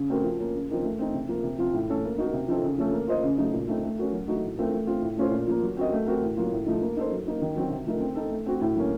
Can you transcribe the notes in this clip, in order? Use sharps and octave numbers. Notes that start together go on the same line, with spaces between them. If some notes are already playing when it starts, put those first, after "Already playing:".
Already playing: C#3
A3 C4 F#4 A#4
F3
A#3 C#4
C#3
F3 C4 D#4 A#4
A3
C4 D#4
C3
F3 A#3
C3
F3 C4 F4
A2
A3 C#4 A4
A#3
D#4 F#4 A#4
C3
F3 C4 D#4 A4
C#3
F3 A3 C#4 A4
A#3
F4 C5 D#5
C#3
F#3 A3 D#4
A#2
A3 C4 D#4
A3
C#4 F#4 A#4
F#3
A3 D#4 F#4
A2
A3 C4 F4 A#4
A3
C4 F4
A2
A3 C#4 F4 C5
A#2
F3 A#3
F#3
C4 F#4 A#4 D#5
A3
C4 F#4 A#4
A2
F#3 A#3 F4
A2
F3 A3 D#4
A#3
D#4 A4 C5
F#3
A#3 D#4 F#4
D#3
F#3 C4 F#4
C3
F3 A3 D#4 A#4
C4
D#4 A4
A3
C4 F#4
A2
F#3 A#3 C#4